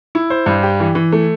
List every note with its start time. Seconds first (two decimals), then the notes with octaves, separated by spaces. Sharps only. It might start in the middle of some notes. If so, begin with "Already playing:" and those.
0.15 E4
0.30 C5
0.46 G2
0.63 G4
0.80 E3
0.95 E3
1.12 A3